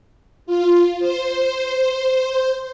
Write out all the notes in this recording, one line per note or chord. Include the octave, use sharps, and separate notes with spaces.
F4
C5